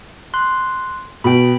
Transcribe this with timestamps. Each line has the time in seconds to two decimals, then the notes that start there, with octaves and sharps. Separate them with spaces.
0.34 C6 F#6
1.24 B2 G5 B5